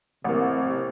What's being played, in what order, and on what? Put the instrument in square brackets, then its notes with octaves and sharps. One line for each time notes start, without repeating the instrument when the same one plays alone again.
[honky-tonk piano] A1 A#3 [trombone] C3